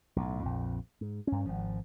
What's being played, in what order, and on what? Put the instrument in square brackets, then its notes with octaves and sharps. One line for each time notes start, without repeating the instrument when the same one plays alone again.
[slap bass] B1 A2
A#1 F2
G#2
G2 C#4
G#1 F3